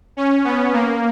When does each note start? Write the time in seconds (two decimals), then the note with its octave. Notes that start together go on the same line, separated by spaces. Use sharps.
0.17 C#4
0.44 B3
0.73 A#3